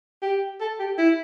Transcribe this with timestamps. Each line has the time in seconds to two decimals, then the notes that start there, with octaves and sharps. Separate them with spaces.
0.22 G4
0.61 A4
0.80 G4
0.98 E4